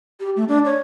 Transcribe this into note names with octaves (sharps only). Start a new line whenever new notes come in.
G4
A3
D4
C#5